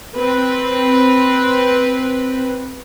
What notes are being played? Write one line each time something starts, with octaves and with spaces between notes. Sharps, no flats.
C4 B4